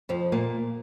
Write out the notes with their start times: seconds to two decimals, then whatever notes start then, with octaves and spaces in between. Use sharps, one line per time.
0.09 F2 F3
0.32 A#2 A#3